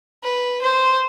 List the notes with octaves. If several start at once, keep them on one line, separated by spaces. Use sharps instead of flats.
B4
C5